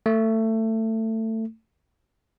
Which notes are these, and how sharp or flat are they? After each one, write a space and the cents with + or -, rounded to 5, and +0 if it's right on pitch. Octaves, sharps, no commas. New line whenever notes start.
A3 +20